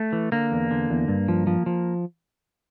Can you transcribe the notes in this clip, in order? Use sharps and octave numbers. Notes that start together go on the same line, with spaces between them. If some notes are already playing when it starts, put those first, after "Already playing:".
Already playing: A3
E3
D3 A#3
E2
D3
E2
G2
F3
F3
F3